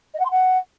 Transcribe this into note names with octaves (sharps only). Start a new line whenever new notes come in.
D#5
F#5
C6
F#5